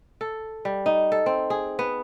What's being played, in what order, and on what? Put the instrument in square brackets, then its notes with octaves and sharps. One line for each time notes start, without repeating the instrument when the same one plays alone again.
[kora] A4
G3
D#4
A4
C4
G#4
B3